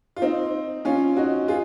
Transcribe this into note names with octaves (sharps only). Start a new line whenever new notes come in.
F4
C4 D#4
C#4 F4
D#4 F#4
F4 G#4